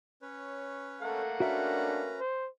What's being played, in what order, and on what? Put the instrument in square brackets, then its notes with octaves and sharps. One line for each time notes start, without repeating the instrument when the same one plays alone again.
[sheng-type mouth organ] C#4 B4 C#5
[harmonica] A3 A#3 F#5 [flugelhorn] A4
[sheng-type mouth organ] C#4 B4 A#5 [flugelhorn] D4 [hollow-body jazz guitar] F#4 A#4 E5
[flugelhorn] C5